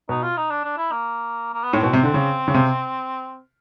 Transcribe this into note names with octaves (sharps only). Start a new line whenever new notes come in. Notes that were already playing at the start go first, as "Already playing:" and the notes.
B2 D#4
F4
D#4
D4
D4
E4
A#3
A#3
B3
A2 C4
B2
C3
D3
C#3
C#3
C3